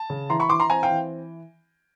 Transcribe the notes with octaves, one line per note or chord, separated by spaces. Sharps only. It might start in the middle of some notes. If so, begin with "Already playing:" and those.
Already playing: A5
C#3
E3 A#5 C6
B5 C#6
E3 C6 D6
A#5 C6
C4 G#5 A#5
F5 G5
E3